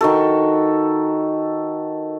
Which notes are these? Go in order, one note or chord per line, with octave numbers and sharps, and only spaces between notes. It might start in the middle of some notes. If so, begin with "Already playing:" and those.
D#3 F#4 A4